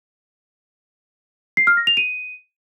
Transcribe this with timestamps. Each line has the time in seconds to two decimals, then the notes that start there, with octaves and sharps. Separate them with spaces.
1.57 C7
1.67 F6
1.77 A#6
1.87 F7
1.97 D#7